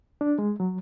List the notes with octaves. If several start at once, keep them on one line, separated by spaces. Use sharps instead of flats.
D4
G#3
F#3